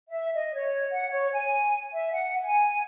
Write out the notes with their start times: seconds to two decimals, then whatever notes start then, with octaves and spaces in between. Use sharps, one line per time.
0.09 E5
0.34 D#5
0.55 C#5
0.91 F#5
1.11 C#5
1.33 G#5
1.94 E5
2.11 F#5
2.41 G#5